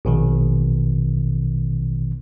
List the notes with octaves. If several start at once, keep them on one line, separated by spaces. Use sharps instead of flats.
A#1 B2 D#3